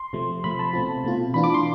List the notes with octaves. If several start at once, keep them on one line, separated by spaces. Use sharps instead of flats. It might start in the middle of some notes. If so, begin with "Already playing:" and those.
Already playing: C6
C3 F3 A3
C3 F3 A3 B5
A5
B2 A3 C4 F4
B2 A3 C4 F4
E3 B3 D4 F4 B5
D6
C6